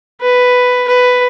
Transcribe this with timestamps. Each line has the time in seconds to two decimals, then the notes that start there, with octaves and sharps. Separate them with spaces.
0.21 B4
0.88 B4